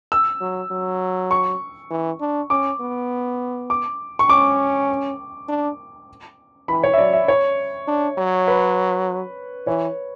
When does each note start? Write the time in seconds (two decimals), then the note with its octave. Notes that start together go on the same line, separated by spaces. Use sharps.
0.12 E6
0.41 F#3
0.71 F#3
1.31 C#6
1.90 E3
2.21 D4
2.50 C#4 D6
2.80 B3
3.70 D6
4.19 C#6
4.29 C#4 D6
5.48 D4
6.68 E3 B5
6.84 C#5
6.94 E5
6.98 F#3 D5
7.13 E5
7.28 C#5
7.87 D4
8.18 F#3
8.48 B4
9.67 E3 C#5